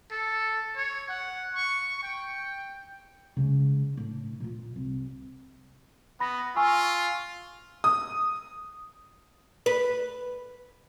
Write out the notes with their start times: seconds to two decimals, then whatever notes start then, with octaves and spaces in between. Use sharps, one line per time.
0.11 A4
0.76 C#5
1.09 F#5
1.55 C#6
2.03 G5
3.37 C#3 G#3
3.93 A2 D4
4.40 A#2 F4
4.76 C2
6.20 B3 B5 A#6
6.56 F4 G#5 C#6 E6
7.84 D#6
9.66 B4